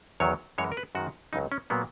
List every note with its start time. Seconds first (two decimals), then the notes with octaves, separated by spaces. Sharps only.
0.20 E2 D#3 F#3 C#5
0.58 F#2 E3 G#3 C#5
0.72 A#4
0.77 B4
0.95 F#2 D#3 G#3 F#4
1.33 C#2 C#3 F#3 D#4
1.52 C#4
1.70 A#2 F#3 A#3 B3